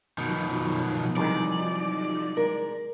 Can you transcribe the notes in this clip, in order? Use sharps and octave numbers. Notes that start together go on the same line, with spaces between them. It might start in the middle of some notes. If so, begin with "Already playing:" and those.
B2 D#3 F3 F#3 D#4
C2 D#3 E3 G#4 D5
G#3 A#4